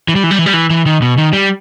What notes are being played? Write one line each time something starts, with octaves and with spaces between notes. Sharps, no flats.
E3
G3
E3
G3
E3
G3
E3
E3
D#3
B2
D#3
G3